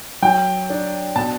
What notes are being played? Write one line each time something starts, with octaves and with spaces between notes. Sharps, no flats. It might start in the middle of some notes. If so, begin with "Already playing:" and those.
F#3 G5
D4
B2 A5